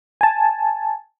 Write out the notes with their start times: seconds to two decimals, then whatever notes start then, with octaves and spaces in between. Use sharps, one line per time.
0.21 G#5 A5